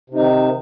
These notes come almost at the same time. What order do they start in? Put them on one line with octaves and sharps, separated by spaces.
C3 D#4 D#3